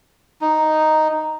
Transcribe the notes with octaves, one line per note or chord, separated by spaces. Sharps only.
D#4